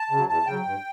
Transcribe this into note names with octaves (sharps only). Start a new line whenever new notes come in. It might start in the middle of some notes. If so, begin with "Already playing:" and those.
Already playing: A5
C#3
F#3
E2 A5
C#3 F#3 G5
G2